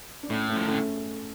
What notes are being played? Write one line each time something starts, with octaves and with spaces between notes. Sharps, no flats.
D4
A2 A3 C#4
A3 C#4
F3
D3 A3 C#4